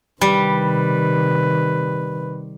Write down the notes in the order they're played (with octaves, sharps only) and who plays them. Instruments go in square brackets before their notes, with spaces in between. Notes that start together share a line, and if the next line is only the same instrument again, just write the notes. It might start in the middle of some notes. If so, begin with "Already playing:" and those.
[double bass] C3 D#3 [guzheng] G3 [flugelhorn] B4